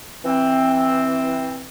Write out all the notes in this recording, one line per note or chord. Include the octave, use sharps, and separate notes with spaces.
E3 C4